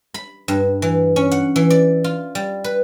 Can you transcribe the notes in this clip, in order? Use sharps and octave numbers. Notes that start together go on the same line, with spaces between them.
B5
G2
E3
C#4
F#5
E3
D5
F4
G3
B4